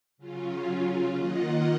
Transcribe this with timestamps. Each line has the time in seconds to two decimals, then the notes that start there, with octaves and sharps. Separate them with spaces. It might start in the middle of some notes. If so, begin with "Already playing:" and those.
0.18 C#3 F#3 C#4 F4
1.14 D#3 A#3 F4 D#5 F#5